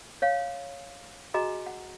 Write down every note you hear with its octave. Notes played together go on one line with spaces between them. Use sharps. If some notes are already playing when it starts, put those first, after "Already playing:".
C#5 F5
F#4 G#4 D#5 G#5 A#5
F#5